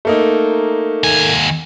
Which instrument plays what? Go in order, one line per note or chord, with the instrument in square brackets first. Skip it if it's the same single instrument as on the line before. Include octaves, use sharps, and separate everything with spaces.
[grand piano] A3 A#3 D#4
[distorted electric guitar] D#2 G#5